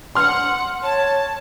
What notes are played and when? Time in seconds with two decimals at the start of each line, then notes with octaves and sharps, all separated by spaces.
0.15 F#5 C6 F6
0.83 C#5 A5